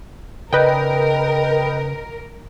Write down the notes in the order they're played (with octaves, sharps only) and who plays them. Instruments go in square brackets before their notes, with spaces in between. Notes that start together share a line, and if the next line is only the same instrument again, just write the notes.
[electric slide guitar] C#3 D5 [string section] A#4 [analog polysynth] B4 D#5 G5